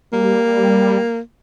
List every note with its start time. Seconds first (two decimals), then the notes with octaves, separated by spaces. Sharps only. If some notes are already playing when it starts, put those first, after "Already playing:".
0.13 G3 A#3